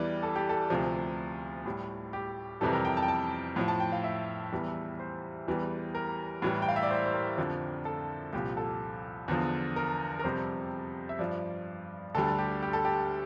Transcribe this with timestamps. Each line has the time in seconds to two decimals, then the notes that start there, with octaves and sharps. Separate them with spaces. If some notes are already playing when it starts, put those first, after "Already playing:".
Already playing: E2 E3 G3 D5
0.23 A4
0.36 G4
0.49 A4
0.70 D2 C3 F3
1.65 A2 G3
2.13 G4
2.61 F2 C3 E3 G3 A4
2.73 A#4
2.85 G5
2.97 A5
3.03 G5
3.08 A5
3.56 A2 F3
3.68 A5
3.80 G5
3.92 F5
4.04 E5
4.52 E2 E3 G3
5.00 C5
5.47 E2 E3 G3
5.95 A#4
6.42 A2 E3 G3
6.62 G5
6.69 F5
6.76 E5
6.83 D5
6.90 C5
7.06 C5
7.14 A#4
7.38 F2 D3 F3
7.85 A4
8.33 C2 A#2 F3 G4
8.57 A4
9.28 E2 D3 F3
9.76 A#4
10.19 A#4
10.24 F2 C3 G3 C5
11.09 E5
11.19 G2 F3 D5
12.15 D2 D3 G3 A4
12.38 G4
12.62 G4
12.73 A4
12.85 G4